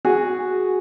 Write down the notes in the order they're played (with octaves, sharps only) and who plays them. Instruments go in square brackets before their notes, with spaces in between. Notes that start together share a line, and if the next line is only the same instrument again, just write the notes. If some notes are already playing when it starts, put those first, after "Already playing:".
[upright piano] F#4 G#4